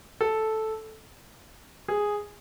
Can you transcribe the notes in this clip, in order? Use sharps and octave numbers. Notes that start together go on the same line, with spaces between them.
A4
G#4